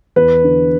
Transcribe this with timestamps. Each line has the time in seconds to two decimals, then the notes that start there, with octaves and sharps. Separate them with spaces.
0.16 E2 B4
0.44 D3